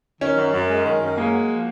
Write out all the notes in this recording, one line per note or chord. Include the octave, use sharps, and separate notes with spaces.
D#3 C#4
F#2
F#2
G#3
D#3
F#2
G#3 A#3
F#4
F3